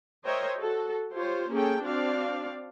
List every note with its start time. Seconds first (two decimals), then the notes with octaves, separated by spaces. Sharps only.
0.24 A#4 C5 C#5 D#5 E5 G5
0.58 F#4 A4
1.13 F4 G4 C5 C#5
1.52 A#3 C#4 G#4 A4 G5
1.81 C4 D4 F#4 D5 F5